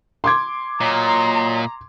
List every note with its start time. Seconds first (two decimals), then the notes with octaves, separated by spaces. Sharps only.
0.24 C6 D6 G#6
0.81 A#2 F#3 D#5 A#5